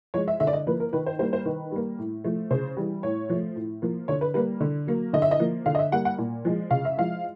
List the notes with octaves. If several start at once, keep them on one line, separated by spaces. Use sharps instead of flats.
F3 G#3 C#5
E5
D3 E5
D5
D#5
F3 A#3 B4
A#4
D#3 B4
C5
G3 A#3 C5
C5
D#3 B4
G3 A#3
A2
F3 A3
C#3 C5
E3 G3
A2 C#5
F3 A3
A2
F3 A#3
D3 C#5
B4
G3 A#3 B4
D3
F#3 A#3
D3 D#5
E5
D#5
F3 A#3
D3 F5
D#5
E5
G3 A#3 F#5
F#5
A#2
F3 G#3
C#3 F5
E5
F3 G#3 F5